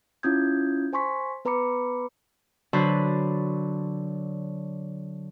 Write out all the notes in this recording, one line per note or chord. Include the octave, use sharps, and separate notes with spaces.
C#4 E4 F4 D#6 G6 G#6
C5 G#5 C6 C#6 B6
B3 B4 A#5 B5 D6 C#7
D3 F#3 D4 B4 C5 B5